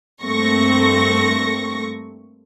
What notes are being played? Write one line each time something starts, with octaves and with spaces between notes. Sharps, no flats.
G2 A3 A#3 C4 C#6 A#6